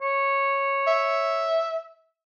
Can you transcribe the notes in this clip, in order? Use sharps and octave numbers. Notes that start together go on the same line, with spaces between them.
C#5
E5